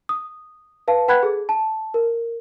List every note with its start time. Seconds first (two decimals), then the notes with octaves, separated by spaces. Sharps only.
0.09 D#6
0.88 B4 F5 A5
1.08 B4 F#5 G5 B5 F#6 G#6
1.23 G#4 A4
1.49 A5
1.94 A#4